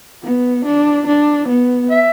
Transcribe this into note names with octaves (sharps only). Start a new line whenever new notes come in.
B3
D4
D4
B3
E5